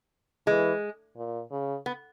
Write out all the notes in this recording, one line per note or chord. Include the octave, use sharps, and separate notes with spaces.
E3 G#3
A#2
C#3
B3